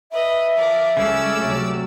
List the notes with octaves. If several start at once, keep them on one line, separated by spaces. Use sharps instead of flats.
B4 D#5 E5
F3 A#4 D5
C#2 C#3 G3 G#3 C#4 A4 D5 E6
C3 F#3 A3